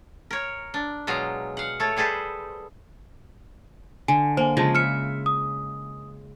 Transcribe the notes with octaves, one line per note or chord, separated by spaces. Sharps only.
A#4 C#5
D4
B2 F#3 G#3 F4 A#5
F5 F#5
A3 A4 C#5
G3 G#4 A4 B4 C5
D3 G#5
A#3 C5 G#5
C#3 F3 G#3 A5 A#6
E5 F6 C#7
D#6